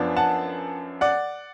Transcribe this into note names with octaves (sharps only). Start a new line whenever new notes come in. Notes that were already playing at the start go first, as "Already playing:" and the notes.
Already playing: F#2 F3 B3 D4
F#5 A5
D5 F#5